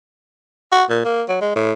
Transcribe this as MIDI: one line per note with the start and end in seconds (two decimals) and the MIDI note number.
0.72 0.84 66
0.90 1.01 46
1.05 1.22 58
1.28 1.36 54
1.41 1.53 56
1.56 1.73 45